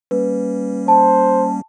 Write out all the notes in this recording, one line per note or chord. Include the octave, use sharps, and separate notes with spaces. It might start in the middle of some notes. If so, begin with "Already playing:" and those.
G3 A#3 C#4 B4
C5 A5